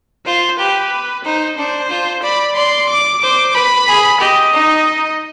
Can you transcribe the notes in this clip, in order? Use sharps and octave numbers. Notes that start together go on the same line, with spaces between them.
F4 C5
G4 B4
D#4 C5
D4 C5
F4
D5 B5
D5 C6
D6
C5 D6
B4 B5
G#4
G4 D#5
D#4